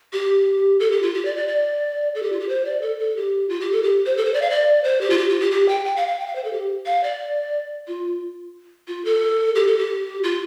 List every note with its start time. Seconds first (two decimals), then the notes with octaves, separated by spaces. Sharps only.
0.13 G4
0.80 A4
0.91 G4
1.02 F4
1.14 G4
1.25 D5
1.37 D5
1.48 D5
2.15 A4
2.23 G4
2.32 F4
2.40 G4
2.49 C5
2.65 D5
2.82 A4
2.99 A4
3.16 G4
3.49 F4
3.60 G4
3.72 A4
3.83 G4
4.06 C5
4.17 A4
4.25 C5
4.34 D5
4.42 F5
4.50 D5
4.84 C5
5.01 G4
5.10 F4
5.18 G4
5.30 F4
5.40 G4
5.51 G4
5.69 G5
5.85 G5
5.96 F5
6.08 F5
6.19 G5
6.27 F5
6.35 C5
6.44 A4
6.53 G4
6.86 F5
7.04 D5
7.88 F4
8.88 F4
9.05 A4
9.55 G4
9.67 A4
9.78 G4
10.23 F4